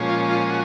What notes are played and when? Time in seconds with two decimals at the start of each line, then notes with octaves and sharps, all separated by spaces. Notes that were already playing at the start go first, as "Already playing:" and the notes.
Already playing: A#2 F3 G#3 C#4
0.09 F4
0.29 F4
0.50 F#4